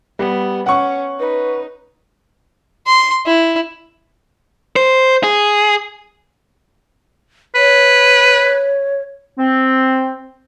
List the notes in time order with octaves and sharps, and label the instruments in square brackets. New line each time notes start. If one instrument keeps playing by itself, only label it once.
[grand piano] G3 [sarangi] B3
[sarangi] C#4 [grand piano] F#5 C#6
[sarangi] D#4 [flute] B4
[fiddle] C6
E4
[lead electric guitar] C5
G#4
[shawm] B4 [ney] C#5
[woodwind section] C4